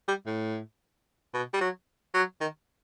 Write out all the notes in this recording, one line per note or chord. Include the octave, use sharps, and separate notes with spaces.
G3
A2
B2
G3
F#3
F#3
D#3